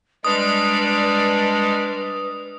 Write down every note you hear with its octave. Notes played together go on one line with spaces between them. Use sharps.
G3 G#3 D4 B4 D5 D#6